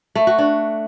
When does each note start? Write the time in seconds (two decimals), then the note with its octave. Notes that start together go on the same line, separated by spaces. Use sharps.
0.15 A3
0.27 F#4
0.38 D4